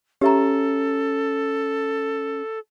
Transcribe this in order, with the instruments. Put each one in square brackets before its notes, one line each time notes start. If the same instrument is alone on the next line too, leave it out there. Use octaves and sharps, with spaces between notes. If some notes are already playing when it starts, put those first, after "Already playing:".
[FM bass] C#4 [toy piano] G4 E5 A#5 [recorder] A4